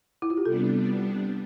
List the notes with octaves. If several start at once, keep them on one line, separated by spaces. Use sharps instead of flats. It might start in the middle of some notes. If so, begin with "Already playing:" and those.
E4
F4
G4
C3 G3 B3 D4 A4